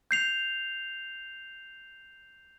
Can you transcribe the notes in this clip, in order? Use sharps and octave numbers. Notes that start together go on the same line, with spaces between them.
G6 C7 F7